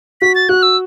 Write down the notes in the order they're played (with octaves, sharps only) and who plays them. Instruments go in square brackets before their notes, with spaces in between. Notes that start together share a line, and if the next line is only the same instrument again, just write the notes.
[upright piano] F#4 [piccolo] B6
[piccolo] A6
[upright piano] F#4 [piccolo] F#6
[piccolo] E6